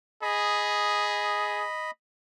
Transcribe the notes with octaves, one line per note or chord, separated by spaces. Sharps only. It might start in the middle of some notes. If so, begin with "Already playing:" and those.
G#4 D#5 B5